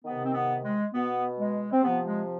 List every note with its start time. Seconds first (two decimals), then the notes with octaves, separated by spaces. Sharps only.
0.05 C3 D#3 B3
0.25 C4
0.34 B3
0.65 G#3
0.94 B2 B3
1.38 G#3
1.72 C4
1.83 C3 F3 B3
2.06 G#3